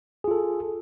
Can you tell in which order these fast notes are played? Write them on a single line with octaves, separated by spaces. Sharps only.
G#4 F4 A4